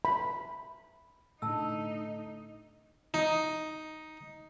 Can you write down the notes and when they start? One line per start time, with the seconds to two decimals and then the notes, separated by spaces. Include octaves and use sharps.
0.05 B5
1.42 A2 D3 D#4 A5 E6
3.14 D#4